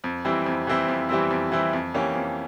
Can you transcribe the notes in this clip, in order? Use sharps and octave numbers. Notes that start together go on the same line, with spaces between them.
F2
E3 G3 C4 E4
F2
E3 G3 C4 E4
F2
E3 G3 C4 E4
F2
E3 G3 C4 E4
F2
E3 A#3 C#4 G4
F2